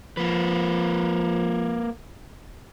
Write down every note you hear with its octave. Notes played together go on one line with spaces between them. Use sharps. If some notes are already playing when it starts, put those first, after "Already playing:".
F3 A#3 B4